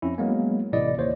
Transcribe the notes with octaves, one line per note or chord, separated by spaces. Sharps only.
F2 C#4 E4
F#3 G#3 A#3 B3
A1 A2 C3 E4 D5 D#5
D#2 C5 C#5